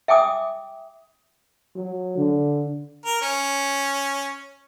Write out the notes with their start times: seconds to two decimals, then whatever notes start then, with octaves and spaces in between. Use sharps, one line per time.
0.08 E5 G5 G#5 D6 D#6
1.76 F#3
2.17 D3
3.05 A#4
3.21 C#4